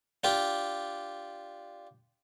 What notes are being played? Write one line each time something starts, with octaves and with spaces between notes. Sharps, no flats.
D4 F4 G4